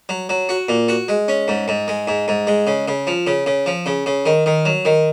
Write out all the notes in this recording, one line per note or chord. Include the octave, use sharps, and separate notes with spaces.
F#3
F#3
F#4
A#2
F#4
G#3
C#4
G#2
G#2
G#3
G#2
G#2
G#3
C#3
C#3
F3
C#3
C#3
F3
C#3
C#3
D#3
D#3
F#3
D#3